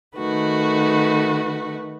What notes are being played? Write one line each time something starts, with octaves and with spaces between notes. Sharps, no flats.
D#3 A3 F#4 B4